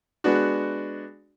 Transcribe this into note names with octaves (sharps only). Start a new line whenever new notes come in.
G#3 B3 D4 F#4